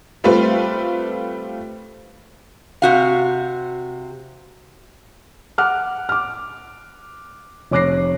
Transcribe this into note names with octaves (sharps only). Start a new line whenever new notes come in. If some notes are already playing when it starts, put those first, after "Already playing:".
G3 A3 C4 F4 B4
C3 F#4 F5
F#5 D6 F6 F#6
D6 F6
F1 C#5 D6 F#6 A#6 C7